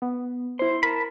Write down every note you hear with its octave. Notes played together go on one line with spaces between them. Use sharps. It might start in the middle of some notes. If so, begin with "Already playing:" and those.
B3
E4 C5 C6
A#4 A5 B5